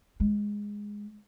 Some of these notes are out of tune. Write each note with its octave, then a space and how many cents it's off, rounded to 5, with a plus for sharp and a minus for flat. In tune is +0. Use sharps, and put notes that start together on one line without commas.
G#3 -5